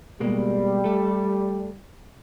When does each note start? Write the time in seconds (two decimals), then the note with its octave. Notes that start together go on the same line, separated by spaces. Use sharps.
0.20 B2 G3 G#3 A#3
0.84 A3 A4